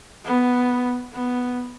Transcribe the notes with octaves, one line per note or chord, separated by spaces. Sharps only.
B3
B3